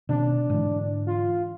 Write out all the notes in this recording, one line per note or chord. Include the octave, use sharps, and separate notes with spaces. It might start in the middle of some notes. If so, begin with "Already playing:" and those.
B2 D#3 C4 D4
G#2 D3 E3
F4